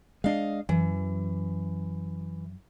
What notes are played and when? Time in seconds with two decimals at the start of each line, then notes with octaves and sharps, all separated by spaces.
0.24 G#3 D4 D#5 F5
0.69 F#2 E3